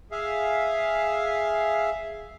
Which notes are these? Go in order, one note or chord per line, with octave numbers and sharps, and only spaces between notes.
G#4 E5 F5